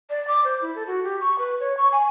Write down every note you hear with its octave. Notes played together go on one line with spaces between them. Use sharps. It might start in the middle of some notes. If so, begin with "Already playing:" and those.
D5
D6
C5
E4
A4
F#4
G4
C#6
B4
C#5
C#6
G#5